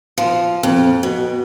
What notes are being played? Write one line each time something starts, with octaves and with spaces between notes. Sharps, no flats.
F3
F2
B2